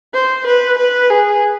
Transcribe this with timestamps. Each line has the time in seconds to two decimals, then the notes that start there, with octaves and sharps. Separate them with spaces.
0.14 C5
0.46 B4
0.78 B4
1.10 G#4